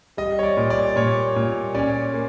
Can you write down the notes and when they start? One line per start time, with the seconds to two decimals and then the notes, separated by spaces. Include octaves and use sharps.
0.17 G3 D#5
0.39 C#5
0.43 D5
0.57 A#2
0.70 D5
0.96 A#2 C#5
1.36 A#2
1.75 C#4 D5
2.14 A#3